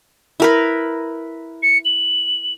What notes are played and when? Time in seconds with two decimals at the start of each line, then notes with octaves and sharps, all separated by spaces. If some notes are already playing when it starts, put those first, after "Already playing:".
0.40 E4 A#4 B4
1.63 C#7
1.85 F#7